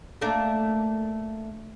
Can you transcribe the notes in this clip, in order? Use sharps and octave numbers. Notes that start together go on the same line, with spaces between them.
A3 A#3 D4